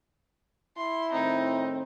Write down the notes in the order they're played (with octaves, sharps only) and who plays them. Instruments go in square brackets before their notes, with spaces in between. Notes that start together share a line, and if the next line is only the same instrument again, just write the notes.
[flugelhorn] E4 [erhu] C6
[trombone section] A2 D#3 C4 [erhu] D#4